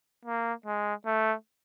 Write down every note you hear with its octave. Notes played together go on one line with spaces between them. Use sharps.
A#3
G#3
A3